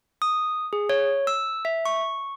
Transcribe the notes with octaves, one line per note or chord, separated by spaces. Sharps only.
D#6
G#4
C#5
E6
E5
C#6